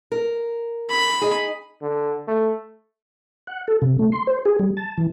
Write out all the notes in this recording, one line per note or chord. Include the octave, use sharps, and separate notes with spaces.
A#4
B5
D#4 G#4
D3
A3
F#5
A4
C3
A3
C6
C5
G#4
G3
A5
E3